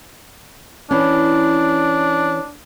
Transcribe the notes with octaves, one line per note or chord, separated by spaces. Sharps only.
E3 C#4 D4